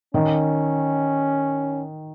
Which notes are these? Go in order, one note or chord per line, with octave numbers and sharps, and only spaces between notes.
D#3 C#4